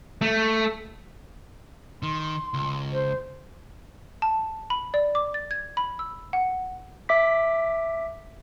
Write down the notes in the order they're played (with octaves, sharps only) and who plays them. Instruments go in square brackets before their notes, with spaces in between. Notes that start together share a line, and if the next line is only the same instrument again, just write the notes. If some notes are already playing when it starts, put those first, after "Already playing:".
[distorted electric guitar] A3
[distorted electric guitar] D#3 [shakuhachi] C6
[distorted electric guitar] C#2
[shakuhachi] C5
[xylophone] A5
B5
D5
D6
A6
G#6
B5
E6
F#5
[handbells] E5 D6 B6